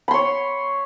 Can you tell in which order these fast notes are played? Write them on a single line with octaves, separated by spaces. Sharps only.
B5 C6 C#5